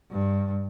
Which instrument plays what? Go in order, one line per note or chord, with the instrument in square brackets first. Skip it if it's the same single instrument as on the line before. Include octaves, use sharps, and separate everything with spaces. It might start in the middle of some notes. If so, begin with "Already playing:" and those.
[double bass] G2